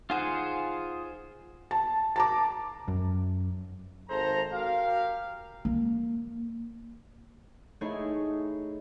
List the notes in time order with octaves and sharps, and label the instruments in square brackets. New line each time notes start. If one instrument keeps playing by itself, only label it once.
[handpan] D#4 F#5 [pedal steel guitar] F4 G#4 C5
[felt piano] A5
A5 A#5 D6
[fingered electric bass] F#2
[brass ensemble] G#1 A4 C5 A#5
F#4 G4 A#4 F5
[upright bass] A#3
[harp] A3 D#4 E4 G#4 C#5